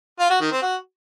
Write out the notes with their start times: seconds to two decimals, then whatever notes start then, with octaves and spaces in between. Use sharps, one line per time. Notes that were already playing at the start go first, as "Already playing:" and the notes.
0.19 F4
0.30 F#4
0.41 D#3
0.52 C4
0.62 F#4